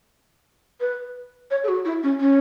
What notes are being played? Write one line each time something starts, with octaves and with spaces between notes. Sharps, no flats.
B4
C#5
A4
F#4
E4
C#4
C#4